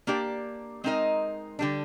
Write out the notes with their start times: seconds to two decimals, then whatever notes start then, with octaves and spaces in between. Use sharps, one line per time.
0.07 A#3 D4 G4 D5
0.84 G#3 C4 D#4 A#4 D#5
1.59 D3 G3 D4